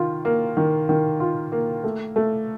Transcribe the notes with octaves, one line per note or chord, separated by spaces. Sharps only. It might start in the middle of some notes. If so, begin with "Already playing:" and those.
Already playing: D#3 F4
A#3
D#3
D#3
F4
A#3
A3
A3